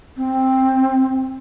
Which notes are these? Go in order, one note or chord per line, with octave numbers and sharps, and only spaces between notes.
C4